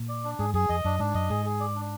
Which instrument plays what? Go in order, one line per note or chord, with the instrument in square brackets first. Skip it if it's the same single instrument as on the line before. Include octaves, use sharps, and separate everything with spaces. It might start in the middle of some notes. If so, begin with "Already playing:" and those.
Already playing: [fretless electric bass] A#2
[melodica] D5
D4
[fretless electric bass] G#2 [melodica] G#4
[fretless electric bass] F#2 [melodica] G#4
[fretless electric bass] F2 [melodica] D#5
[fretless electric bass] F#2 [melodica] D4
[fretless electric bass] G#2 [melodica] D4
[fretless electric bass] F#2 [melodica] D#5
[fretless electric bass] G#2 [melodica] G#4
[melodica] G#4
D5
D4